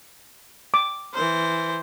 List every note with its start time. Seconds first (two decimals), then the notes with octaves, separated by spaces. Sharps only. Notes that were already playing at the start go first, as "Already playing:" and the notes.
0.74 D6
1.14 E3 C5